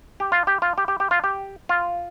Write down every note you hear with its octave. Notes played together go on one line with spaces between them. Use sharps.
G4
F4
G4
F4
G4
G4
G4
F4
G4
F4